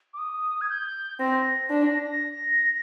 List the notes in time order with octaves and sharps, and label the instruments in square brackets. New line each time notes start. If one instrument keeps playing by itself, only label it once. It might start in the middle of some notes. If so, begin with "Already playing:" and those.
[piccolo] D6
D#6
G#6
G6
[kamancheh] C4 [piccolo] A#6
[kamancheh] D4
[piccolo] A#6
A#6